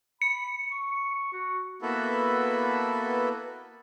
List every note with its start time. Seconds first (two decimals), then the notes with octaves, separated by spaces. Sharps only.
0.22 B5 C#7
0.72 C#6
1.33 F#4
1.82 A#3 B3 E4 F#4 A4 B4